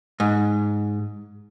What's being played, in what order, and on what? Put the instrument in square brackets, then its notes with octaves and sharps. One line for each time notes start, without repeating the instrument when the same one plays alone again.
[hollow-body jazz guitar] G#2